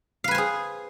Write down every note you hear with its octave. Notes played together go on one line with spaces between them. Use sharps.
G#4 B4 C5 F5 G#5